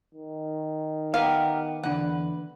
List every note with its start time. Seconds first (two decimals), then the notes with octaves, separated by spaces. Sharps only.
0.15 D#3
1.14 B3 G4 A#4 B4 F5
1.83 E2 D3 B4 F#5